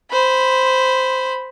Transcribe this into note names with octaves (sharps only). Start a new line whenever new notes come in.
C5 B5